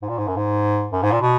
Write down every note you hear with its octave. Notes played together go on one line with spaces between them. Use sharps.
G#2
A#2
G#2
F#2
G#2
F#2
G#2
A#2
B2